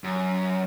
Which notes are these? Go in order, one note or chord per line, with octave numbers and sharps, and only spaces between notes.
F#2